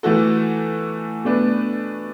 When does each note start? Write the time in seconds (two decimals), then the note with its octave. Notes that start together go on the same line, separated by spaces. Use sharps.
0.03 E3 A3 F#4 A4
1.24 B2 A3 D4 B4